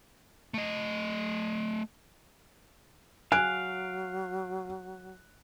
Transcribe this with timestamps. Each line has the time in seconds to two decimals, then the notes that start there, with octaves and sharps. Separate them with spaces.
0.54 A3 D#5
3.32 F#3 G#4 F5 F#6 D7